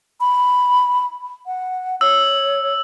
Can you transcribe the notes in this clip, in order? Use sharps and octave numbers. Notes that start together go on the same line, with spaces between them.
B5
F#5
C#5 E6